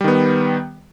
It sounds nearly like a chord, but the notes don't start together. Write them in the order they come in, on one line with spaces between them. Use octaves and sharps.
G3 D#3 B3